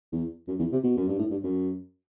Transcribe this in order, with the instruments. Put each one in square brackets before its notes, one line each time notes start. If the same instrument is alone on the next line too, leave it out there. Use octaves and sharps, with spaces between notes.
[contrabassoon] E2
F#2
E2
C3
B2
F#2
G2
A2
G2
F#2